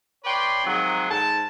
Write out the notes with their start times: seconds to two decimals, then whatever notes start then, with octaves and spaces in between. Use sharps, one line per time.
0.24 B4 C#5 D5 G5 C6
0.64 C3 D#3 F3 F#3 G#3 G#4
1.09 G#2 A5